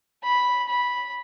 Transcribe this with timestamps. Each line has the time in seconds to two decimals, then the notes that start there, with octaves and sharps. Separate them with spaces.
0.23 B5
0.68 B5